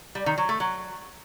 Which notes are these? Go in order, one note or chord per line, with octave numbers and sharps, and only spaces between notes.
G3
D#3
F#3
A3
F#3